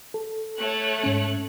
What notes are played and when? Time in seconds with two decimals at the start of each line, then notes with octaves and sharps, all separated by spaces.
0.14 A4
0.58 A3 C#5 F#6
1.04 G#2 C#4